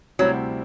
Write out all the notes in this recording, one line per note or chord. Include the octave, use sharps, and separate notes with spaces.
D2 C3 F#3 G3 C4 E4